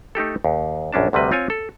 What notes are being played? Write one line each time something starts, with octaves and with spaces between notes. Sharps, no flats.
A3 D#4 G4 A4
D#2
A#1 F#2 C#4 D4 A5
D2 C3 G3 B4 D#5
C4 F4 C#5 G#5
A4